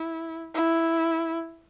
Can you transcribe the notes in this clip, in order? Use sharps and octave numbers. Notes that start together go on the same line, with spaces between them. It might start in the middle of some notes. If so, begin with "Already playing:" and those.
Already playing: E4
E4